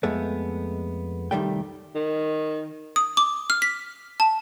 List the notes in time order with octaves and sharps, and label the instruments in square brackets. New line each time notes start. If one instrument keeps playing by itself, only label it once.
[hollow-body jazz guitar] F2 G#3 A3 B3
C2 C3 D#3 G3 A3 G5
[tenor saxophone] D#3
[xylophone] D#6
D6
F6
B6
A5